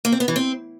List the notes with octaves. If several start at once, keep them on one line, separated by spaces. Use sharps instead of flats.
A#3
C4
B3
E3
C4